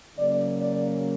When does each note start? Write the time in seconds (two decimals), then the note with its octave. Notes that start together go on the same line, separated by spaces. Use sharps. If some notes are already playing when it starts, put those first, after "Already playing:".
0.18 C#3 F#3 A#3 D5
0.60 D5